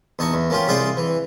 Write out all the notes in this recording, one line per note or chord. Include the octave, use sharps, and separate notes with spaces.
E2 D#4 A5 C#6
E2
A#3 C#4 F4 G4
C2 F4 G#4 C5 D5 C6
E3